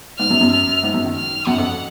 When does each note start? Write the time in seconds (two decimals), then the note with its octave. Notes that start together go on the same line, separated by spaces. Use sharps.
0.19 G#2 F6
0.31 F#2
0.41 F#2
0.52 F6
0.83 G#2
0.94 F#2
1.05 D#3
1.15 F6
1.47 F#2 F#5
1.58 F2